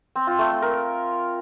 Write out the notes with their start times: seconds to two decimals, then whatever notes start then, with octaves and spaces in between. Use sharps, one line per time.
0.16 C4
0.27 F4
0.39 A3
0.51 A3
0.62 A#4